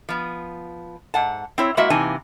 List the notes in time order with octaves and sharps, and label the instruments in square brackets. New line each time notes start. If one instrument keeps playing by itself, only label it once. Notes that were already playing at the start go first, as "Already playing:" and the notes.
[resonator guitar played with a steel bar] F3 B3
G#2 F#5 A5
C4 E4 C#5
G#3 A#3 E4 F#4 E5
C3 E3 A#3 D#4 G#5 A5